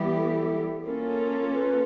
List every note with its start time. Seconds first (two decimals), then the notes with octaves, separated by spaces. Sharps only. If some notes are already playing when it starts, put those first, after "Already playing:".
Already playing: E3 G3 B3 E4 G4
0.17 A4
0.85 A#3 C#4 F4 A4 A#4
1.53 B4